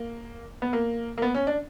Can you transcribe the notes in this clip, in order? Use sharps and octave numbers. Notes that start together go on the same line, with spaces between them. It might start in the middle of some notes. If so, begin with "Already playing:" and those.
Already playing: A#3
B3
A#3
A#3
B3
C#4
D4